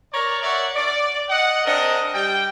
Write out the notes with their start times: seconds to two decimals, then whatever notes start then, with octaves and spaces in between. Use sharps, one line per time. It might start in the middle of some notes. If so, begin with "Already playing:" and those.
0.13 A#4 C#5 D5 A#5
0.43 A#4 C#5 D5 E5 F#5
0.76 D5
1.29 D#5 F#5
1.65 C4 D4 A#4 D#5
2.14 G3 G5